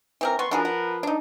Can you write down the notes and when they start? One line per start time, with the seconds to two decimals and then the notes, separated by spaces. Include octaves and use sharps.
0.21 E3 C4 A#4
0.39 B3 C6 C#6
0.51 F3 D4 F#4 G#4 A#4 B4
0.65 F#5
1.03 D4 D#4